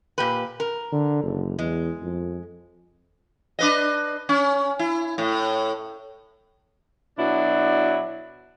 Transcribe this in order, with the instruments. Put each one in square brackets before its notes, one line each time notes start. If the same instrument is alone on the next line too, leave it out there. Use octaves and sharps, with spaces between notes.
[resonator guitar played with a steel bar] A#2 G4 B4
A#4
[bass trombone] D3
F#1
[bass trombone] E2 [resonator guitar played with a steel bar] G#3
[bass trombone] F2
[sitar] D4 B4 D#5
C#4
E4
A2
[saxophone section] B2 F#3 D4 E4